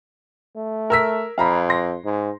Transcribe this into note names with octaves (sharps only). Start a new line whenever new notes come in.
A3
A#4 E6 B6
F2 F5 A#5 B5
C6 A#6
G#2